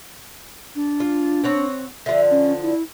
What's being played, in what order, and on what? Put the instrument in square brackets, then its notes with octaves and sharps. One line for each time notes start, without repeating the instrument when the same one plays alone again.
[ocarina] D4
[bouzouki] F4
C4 C#5 F#5
[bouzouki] D3 F3 [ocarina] E5
[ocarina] C#4
E4